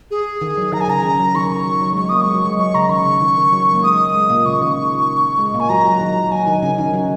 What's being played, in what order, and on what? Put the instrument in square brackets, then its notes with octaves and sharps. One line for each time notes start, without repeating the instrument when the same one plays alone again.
[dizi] G#4
[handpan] D#3
F#3
[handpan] D#3 [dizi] A#5
[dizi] G#5
[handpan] C#3 [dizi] A#5
[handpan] D#3
F#3
[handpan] D#3 [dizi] C#6
[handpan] F#3
F#3
G#3
[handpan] F#3 [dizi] C#6
[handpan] A#3 [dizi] D#6
[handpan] G#3 [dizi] C#6
[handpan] F#3
G#3
[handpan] F#3 [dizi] C#6
[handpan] C#3 [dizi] A#5
[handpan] D#3 [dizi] C#6
[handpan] C#3
D#3
D#3
F#3
A#3
[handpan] G#3 [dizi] D#6
[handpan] G#3
A#2 A#3
[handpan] C#3 [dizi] C#6
[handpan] D#3
G#3
A#2 A#3
[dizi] G#5
[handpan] F#3 F#4 [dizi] A#5
[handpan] F#3 F#4
D#3 D#4
[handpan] F#3 F#4 [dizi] G#5
[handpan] D#3 D#4
C#3 C#4
D#3 D#4
F#3 F#4